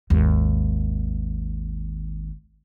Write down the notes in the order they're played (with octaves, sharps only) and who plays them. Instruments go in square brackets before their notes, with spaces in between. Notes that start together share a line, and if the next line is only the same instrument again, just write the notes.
[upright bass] G#1 D#2